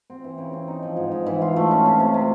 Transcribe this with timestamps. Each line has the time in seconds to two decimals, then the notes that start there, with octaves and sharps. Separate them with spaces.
0.10 C4
0.24 E3
0.38 C#3
0.53 C4
0.68 D#4
0.83 F3
0.97 G#2
1.12 G#2
1.26 E3
1.42 F4
1.56 A3
1.71 C#4
1.86 C3
2.00 C3
2.14 C3